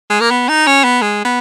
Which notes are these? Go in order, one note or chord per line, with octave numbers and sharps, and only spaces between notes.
G#3
A#3
B3
D#4
C#4
B3
G#3
B3